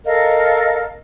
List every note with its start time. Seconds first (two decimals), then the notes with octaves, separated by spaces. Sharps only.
0.05 A4 A#4 D#5 F5